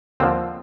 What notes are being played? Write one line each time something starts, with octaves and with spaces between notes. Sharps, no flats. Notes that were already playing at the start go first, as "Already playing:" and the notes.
D#2 D3 F3 C4